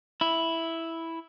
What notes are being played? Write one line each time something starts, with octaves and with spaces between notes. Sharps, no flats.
E4